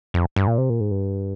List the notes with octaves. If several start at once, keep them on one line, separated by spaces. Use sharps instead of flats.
F2
G2
A#2
C3
A#2
G#2
G2